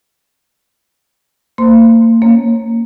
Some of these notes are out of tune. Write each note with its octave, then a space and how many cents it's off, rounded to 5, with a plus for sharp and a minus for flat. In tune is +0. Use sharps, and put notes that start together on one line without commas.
A#3 -35 C5 -20 C6 +0
A#3 +0 C#4 +0 C#5 -20